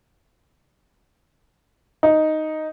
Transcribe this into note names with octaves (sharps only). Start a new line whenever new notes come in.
D#4